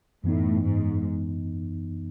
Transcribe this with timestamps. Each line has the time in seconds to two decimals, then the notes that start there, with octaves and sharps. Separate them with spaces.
0.24 F#2 A2 E3 B3 D#4
0.63 G#2